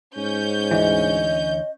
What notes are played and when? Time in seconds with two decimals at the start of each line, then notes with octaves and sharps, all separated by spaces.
0.17 G#2 C#4 G6
0.71 D2 D3 E3 D#5